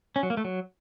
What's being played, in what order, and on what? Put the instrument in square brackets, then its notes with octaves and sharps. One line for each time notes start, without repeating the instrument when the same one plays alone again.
[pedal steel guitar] C#4
F#3
A#3
A3
F#3